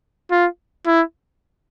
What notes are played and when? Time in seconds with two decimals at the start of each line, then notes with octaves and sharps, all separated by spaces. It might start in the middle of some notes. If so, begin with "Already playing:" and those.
0.31 F4
0.86 E4